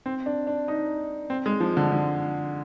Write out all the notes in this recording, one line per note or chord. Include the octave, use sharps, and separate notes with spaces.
C4
D4
D4
D#4
C4
G#3
F3
D3
D3